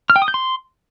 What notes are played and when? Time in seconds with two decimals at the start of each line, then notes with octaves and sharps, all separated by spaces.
0.10 F6
0.16 G5
0.22 D#6
0.28 G6
0.34 C6